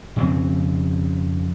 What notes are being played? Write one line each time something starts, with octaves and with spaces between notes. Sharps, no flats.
F2 C#3 C4